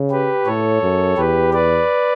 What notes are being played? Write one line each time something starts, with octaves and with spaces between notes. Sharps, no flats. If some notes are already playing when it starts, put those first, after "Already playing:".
Already playing: C#3
G4 B4
A2 A4 C#5
F#2
E2 G4 B4
B4 D5